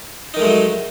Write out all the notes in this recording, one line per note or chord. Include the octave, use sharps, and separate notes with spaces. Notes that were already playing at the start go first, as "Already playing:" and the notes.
D#3 F#3 G#3 A3 D#4